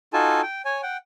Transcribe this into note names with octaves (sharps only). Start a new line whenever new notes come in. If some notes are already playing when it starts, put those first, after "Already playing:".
D#4 F4 F#4 A4 G#5 A5
G5
C#5 G#5
F#5 G5